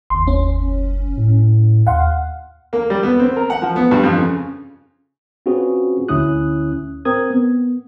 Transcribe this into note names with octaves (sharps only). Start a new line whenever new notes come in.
F#1 D#2 C6
C#4
A2
D#2 F5 F#5 C6
A#3
G3
B3
C4
A#4
F#5
F3
B3
G2
F2
C#3
C4 C#4 F4 F#4 G#4 B4
D2 D3 C#4 E4 D#6 F#6
C4 A#4 D#6 G#6
B3